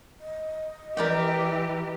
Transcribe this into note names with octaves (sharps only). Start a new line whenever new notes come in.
D#5
E3 G4 A#4 D5 G5